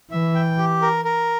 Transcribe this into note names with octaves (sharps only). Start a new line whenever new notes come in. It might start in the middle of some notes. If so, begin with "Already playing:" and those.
E3 E5
G5
G4
A#4
A#4